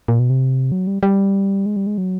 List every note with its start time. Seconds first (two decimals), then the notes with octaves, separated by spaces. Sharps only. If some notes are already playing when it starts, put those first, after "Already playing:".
0.08 A#2
0.19 B2
0.30 C3
0.72 F#3
0.87 G3
1.03 G3
1.66 G#3
1.76 G3
1.87 G#3
1.98 F#3